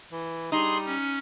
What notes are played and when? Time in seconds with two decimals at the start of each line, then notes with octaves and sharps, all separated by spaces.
0.12 E3
0.52 G3 D#4 G#4 C6
0.86 C#4